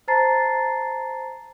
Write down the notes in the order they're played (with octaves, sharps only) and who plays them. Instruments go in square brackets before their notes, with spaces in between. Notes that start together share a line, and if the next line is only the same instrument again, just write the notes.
[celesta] C5 A5 A#5 A6 C7